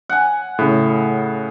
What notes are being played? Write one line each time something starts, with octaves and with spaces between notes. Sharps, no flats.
F#5 G#5
A2 C#3